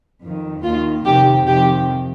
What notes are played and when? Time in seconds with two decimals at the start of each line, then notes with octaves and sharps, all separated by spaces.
0.22 F2 D#3
0.63 D#2 D#3 F4
1.05 F2 C3 D#3 G4
1.47 F2 C3 D#3 G4